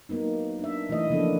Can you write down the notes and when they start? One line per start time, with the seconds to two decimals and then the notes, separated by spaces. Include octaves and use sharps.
0.09 F#3 A#3 B3 D#4
0.59 D4 E5
0.89 B2 E3 A3 E4 D#5
1.10 C#3 F3 A#3 B3 D4 A4